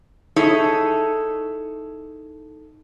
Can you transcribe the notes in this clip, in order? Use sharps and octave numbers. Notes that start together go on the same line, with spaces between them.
D#4 E4 G#4 A4 C#5